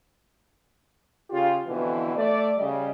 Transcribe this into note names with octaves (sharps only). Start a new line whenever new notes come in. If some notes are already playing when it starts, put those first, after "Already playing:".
C#3 F4 G4
F2 B2 D3 E3
A3 D5
C#3 G3 D#5